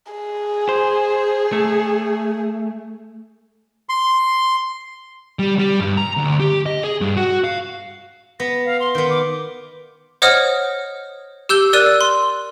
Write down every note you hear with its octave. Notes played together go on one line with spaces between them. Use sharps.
G#4
C5
A3
C6
G3
G3
G2
A#5
D2
G4
D#5
G#4
G2
F#4
F5
B3 A#6
F5
C6
D#3 B3
D6
C5 C#5 D#5 F#5 D#6 F6
G4 E6 G6 G7
A#4 D5 E6 F#6 D#7
C6